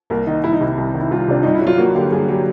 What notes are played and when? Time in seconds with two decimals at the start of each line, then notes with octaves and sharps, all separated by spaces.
0.10 C2 A#3
0.27 D#3 D#4
0.44 C2 E4
0.53 D#4
0.61 C3 E4
0.78 C2
0.94 D#3
1.00 E4
1.11 C2 F4
1.28 C3 D4
1.43 G2 D#4
1.55 E4
1.61 F#3
1.67 F4
1.78 A#3 F#4
1.95 D3 G4
2.12 G2 G#4
2.28 F#3 G4